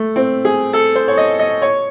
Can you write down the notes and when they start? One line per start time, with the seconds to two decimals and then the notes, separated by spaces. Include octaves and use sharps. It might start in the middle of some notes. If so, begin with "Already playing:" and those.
Already playing: A3
0.16 C4
0.45 G#4
0.73 A4
0.96 C5
1.08 C#5
1.17 D#5
1.39 D#5
1.62 C#5